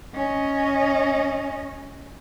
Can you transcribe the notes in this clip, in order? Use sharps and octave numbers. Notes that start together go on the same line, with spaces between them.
C#4 D#5